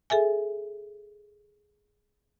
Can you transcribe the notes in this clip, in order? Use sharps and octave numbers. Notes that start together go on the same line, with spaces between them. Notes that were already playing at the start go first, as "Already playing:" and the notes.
G#4 A4 E5 G#5